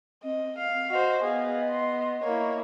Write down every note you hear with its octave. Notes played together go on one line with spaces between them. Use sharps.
C4 D#5
F5
F#4 C5 D#5
B3 G#4 F5
C6
A#3 E4 C#5